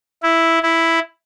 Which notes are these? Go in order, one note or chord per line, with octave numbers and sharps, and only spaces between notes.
E4
E4